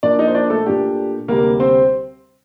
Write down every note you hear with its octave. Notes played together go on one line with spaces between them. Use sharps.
A#2 F3 A#3 D4 D5
D#4 D#5
C5
D4 D5
A3 A4
A#2 A3 D4 G4
D2 C3 G3 A#3 A#4
C4 C5